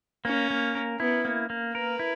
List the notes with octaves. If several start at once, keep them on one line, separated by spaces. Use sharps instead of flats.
A#3 C#4
A#3
A#4
B3 E4
A#3
A#3
A#4 B4
E4